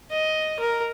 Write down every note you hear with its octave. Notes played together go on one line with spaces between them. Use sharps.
D#5
A#4